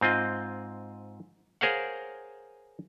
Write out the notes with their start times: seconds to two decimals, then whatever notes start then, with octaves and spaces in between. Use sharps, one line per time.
0.01 G#2 C4 F4 D#5
1.61 G#4 A#4 C5 C#5 F5 F#5